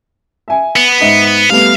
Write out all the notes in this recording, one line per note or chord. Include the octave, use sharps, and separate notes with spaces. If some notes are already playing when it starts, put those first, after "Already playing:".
E5 G#5
B3
G#2 D#5 E5
G3 A3 B3 F5